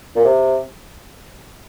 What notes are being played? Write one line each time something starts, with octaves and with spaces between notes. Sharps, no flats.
A#2
C3